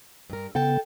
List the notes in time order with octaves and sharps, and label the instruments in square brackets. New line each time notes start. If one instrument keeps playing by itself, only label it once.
[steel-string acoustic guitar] G2 A#4
[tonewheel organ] C#3 B3 [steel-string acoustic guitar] A4 G5 A5